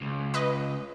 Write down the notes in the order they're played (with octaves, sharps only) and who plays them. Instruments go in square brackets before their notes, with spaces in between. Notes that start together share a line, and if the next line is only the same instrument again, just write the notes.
[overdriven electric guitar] C#2
[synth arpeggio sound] B4 D#5